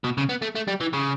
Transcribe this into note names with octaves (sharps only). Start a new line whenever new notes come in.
B2
C#3
B3
A3
A3
G3
E3
C#3